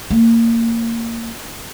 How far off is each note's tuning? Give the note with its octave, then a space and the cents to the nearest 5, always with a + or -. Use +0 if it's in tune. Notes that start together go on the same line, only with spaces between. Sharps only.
A#3 -20